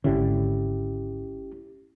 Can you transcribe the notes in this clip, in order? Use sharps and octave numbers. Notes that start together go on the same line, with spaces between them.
G#1 D3 C#4 E4 G4